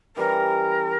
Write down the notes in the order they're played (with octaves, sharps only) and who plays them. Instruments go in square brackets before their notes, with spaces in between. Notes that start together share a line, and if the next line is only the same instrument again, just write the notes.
[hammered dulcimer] E3 G3 C#4 [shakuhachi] A#4